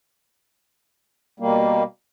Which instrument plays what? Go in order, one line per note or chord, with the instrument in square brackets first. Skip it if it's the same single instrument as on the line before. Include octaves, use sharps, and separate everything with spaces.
[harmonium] B2 G3 A#3